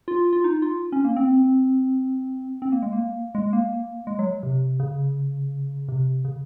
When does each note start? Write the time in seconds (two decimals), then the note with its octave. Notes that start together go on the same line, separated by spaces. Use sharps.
0.08 F4
0.33 F4
0.44 D#4
0.62 F4
0.92 C#4
1.05 A#3
1.17 C4
2.62 C4
2.72 A#3
2.82 G#3
2.93 A#3
3.35 G#3
3.53 A#3
4.07 G#3
4.19 F#3
4.43 C3
4.80 C#3
5.88 C3
6.25 C#3